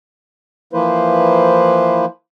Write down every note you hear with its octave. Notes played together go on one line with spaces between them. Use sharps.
E3 F3 A#3 E4 B4 C5